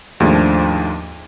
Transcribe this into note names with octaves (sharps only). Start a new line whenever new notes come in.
D#2 G#2 F3 A3 D4